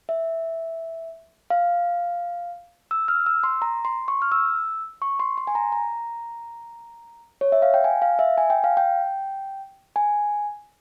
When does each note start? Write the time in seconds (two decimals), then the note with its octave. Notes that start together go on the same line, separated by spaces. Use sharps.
0.09 E5
1.50 F5
2.91 E6
3.08 F6
3.26 E6
3.44 C6
3.62 A#5
3.85 C6
4.08 C#6
4.22 F6
4.32 E6
5.02 C#6
5.20 C6
5.37 C6
5.47 G#5
5.55 A#5
5.72 A#5
7.41 C#5
7.52 E5
7.62 F5
7.74 G5
7.84 G#5
8.02 F5
8.19 E5
8.38 G#5
8.50 G5
8.64 F5
8.77 G5
9.96 G#5